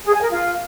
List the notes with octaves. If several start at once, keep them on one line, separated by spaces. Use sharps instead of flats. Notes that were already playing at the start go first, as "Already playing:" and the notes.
G#4
G#5
A#4
F4